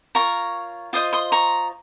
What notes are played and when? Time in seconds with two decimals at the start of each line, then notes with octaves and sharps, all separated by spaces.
0.15 F4 A#4 C#5 A#5 C#6
0.93 F4 C5 D#5 D#6
1.13 C6 D#6
1.32 A#5 C#6